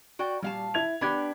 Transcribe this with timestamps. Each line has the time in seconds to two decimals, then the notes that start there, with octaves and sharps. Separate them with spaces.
0.19 F#4 D5 G5
0.42 A#2 G3 F5 A5
0.74 E4 G#6 F7
1.01 B3 D4 G4 B5 D6 G#6